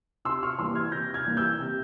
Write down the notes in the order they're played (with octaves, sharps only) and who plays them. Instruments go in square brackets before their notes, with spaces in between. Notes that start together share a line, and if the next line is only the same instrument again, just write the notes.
[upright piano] C3 C6 E6
C#6 F6
E3 G3 A#3 C6 E6
F6 G#6
C3 G6 A#6
F6 G#6
E3 G3 A#3
E6 G6
C3